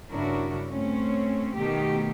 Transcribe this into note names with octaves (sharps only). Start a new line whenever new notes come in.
G2 C#3 D4 E4 F#4 A#4
A3 C4 C#4
B2 D#3 A3 G4